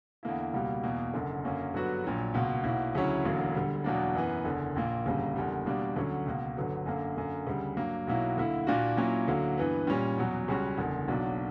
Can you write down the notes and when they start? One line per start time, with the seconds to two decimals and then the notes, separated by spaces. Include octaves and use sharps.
0.23 E2 D3 A#3 E4
0.53 C#2 B2 G3 A#3
0.83 E2 B2 A#3
1.13 F#1 F#2 D3
1.44 F#2 D3 A#3 C#4
1.74 G2 D3 F#3 B3 F#4
2.04 A#1 A#2 F#3
2.34 C#2 B2 A#3
2.64 B1 B2 A#3 E4
2.95 D2 C#3 F#3 C#4 E4
3.24 E1 D2 D3 F#3 A#3
3.55 D2 D3 G3
3.84 E2 B2 F#3 A#3 D4
4.15 F#2 E3 B3
4.45 F#1 E2 D3
4.76 A#1 A#2 A#3
5.06 G1 F#2 C#3 G3 A#3
5.36 F#1 E2 D3 G3
5.66 E2 B2 G3 A#3 D4
5.96 D2 D3 F#3 C#4
6.26 C#2 B2 A#3
6.56 G1 G2 D3 F#3 B3
6.86 F#2 D3 A#3
7.17 F#2 D3 A#3
7.47 D2 C#3 G3
7.77 G2 F#3 A#3
8.07 B1 B2 F#3 A#3 E4
8.37 D2 D3 A#3 E4
8.67 A#2 A#3 D4 F#4
8.97 A#2 F#3 A#3 C#4 E4
9.28 D2 D3 F#3 A#3
9.58 G2 E3 B3
9.87 A#2 G3 C#4
10.17 E2 B2 F#3
10.48 C#2 C#3 G3 C#4 F#4
10.78 F#1 E2 D3
11.08 B1 B2 F#3 A#3 D4